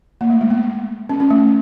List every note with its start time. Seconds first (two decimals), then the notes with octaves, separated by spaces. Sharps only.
0.21 A#3
0.30 A3
0.41 G#3
0.50 B3
1.09 C#4
1.20 C#4
1.30 A3